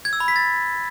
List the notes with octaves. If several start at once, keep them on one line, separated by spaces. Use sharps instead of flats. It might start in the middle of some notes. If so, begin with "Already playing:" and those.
G#6
E6
B5
B6
A6